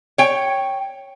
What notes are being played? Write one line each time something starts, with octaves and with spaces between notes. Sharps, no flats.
C#5 G5